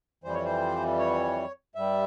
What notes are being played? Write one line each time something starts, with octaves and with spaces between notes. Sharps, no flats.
F2 E3 G3 C5
C#5
C5
C#5
G2 G3 E5